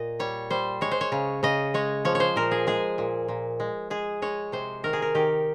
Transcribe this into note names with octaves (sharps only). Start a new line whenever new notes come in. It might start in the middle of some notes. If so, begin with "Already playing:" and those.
Already playing: A#2 D#5
G3 C#5
G3 C5
G#3 C#5
C5
C#5
C#3
C#3 D#5
G#3 C#5
F3 C#5
C#5
C5
A#2 A#4
G#4
G#3 G#4
A#2
A#2
G#3
G#3 G#4
G#3 C#5
C3 C5
D#3 A#4
G#4
A#4
D#3 G4